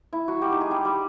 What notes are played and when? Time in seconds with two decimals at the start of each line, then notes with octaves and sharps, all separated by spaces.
0.13 E4
0.28 F#3 F#4
0.42 G3 G4
0.52 D#4
0.61 G#3 G#4
0.71 G3 G4
0.85 G3 G4